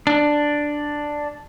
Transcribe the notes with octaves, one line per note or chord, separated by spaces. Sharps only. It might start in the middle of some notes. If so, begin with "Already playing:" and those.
D4